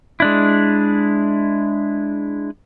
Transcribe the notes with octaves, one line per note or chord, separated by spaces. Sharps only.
G#3 D4 E4